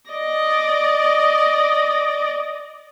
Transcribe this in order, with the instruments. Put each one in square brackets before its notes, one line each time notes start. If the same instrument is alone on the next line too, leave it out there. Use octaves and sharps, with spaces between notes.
[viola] D5 D#5